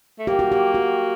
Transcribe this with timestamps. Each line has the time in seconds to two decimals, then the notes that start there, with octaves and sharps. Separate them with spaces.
0.19 A3
0.27 A#3 G4
0.39 F#4
0.52 G4
0.75 F#4